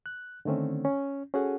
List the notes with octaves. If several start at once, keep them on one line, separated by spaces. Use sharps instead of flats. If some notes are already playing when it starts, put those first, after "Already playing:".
F#6
D3 D#3 A3 C4 C#4
C#4
C#4 F#4 G#4 A4 F#5